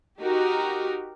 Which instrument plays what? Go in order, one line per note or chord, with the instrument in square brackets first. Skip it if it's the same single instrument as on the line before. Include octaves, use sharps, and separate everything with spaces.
[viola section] D#4 F#4 G4 A#4